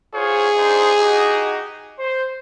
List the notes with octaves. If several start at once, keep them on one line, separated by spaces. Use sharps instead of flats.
F4 G#4 C5 C#5
D4 D#4 C5
D#4 F#4 G4
C5